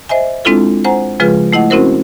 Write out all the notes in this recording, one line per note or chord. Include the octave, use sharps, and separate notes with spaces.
C5 D#5 E5 G#5
G#3 C4 D4 E4 F4 A4
C5 F#5 G#5 A#5
C#3 F3 G#3 F4 G#4 B4
A3 E4 D#5 F#5
C4 C#4 E4 F#4 A#4 C5